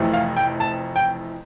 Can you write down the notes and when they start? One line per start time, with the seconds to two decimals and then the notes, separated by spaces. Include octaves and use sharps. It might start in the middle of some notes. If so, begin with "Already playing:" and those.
Already playing: F1 F2 C3 E3 A3
0.13 F5
0.37 G5
0.60 A5
0.96 G5